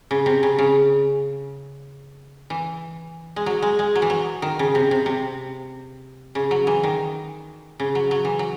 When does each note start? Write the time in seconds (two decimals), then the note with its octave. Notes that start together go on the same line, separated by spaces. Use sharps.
0.11 C#3
0.26 C3
0.43 C#3
0.59 C#3
2.50 E3
3.36 G#3
3.46 F#3
3.62 G#3
3.79 G#3
3.95 F#3
4.02 E3
4.10 F#3
4.42 D#3
4.59 C#3
4.75 C3
4.91 C3
5.06 C3
6.35 C#3
6.51 F#3
6.67 E3
6.84 D#3
7.80 C#3
7.95 F#3
8.11 F#3
8.25 E3
8.39 F#3